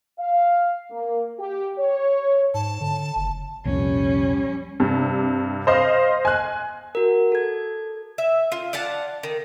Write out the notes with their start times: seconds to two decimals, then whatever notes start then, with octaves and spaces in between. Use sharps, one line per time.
0.19 F5
0.91 A#3
1.39 G4
1.78 C#5
2.54 G#2 A5
2.81 D3
3.16 F#1
3.65 C2 F2 A#2 G3 C#4
4.80 G2 C3
5.67 C5 D#5 F5 C6
6.25 G#5 F#6
6.95 F#4 A#4
7.32 A4 G#6
8.18 E5
8.52 F4
8.73 D5 F5 F#5 A5
9.23 D#3